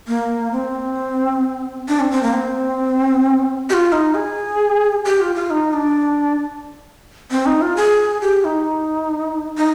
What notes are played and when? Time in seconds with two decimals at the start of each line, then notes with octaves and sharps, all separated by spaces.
0.08 A#3
0.53 C4
1.88 D4
2.00 C4
2.11 C4
2.23 A#3
2.34 C4
3.70 G4
3.73 F4
3.92 D#4
4.14 G#4
5.05 G4
5.20 F4
5.35 F4
5.50 D#4
5.73 D4
7.31 C4
7.46 D#4
7.62 F4
7.77 G#4
8.22 G4
8.45 D#4
9.57 D#4